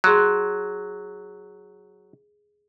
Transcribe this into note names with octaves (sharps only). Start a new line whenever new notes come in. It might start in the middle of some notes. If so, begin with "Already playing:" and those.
F#3 G#4 C6 F#6